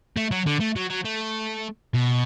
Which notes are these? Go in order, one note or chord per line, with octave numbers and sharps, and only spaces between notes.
A3
F#3
D3
A3
F#3
F#3
A3
B2